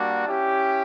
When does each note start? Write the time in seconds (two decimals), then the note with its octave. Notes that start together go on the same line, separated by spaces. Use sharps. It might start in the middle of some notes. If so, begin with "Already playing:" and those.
Already playing: G3 A#3 D4 F#4
0.27 C#4 E4 G4